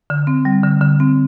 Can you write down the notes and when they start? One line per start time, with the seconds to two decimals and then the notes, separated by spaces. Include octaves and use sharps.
0.10 D3
0.27 C4
0.45 G3
0.63 D3
0.81 D3
1.00 C4